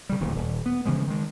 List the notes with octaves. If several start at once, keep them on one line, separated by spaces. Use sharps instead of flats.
C#3 G3
D1 D#2 A#2
D#1
B3
C#3 E3 F3 G#3
D#3 G#3